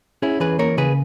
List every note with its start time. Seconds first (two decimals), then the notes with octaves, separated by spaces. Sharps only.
0.22 C#4 E4 G#4
0.40 E3 G#4 B4
0.59 A#3 A#4 C#5
0.78 C#3 G#4 B4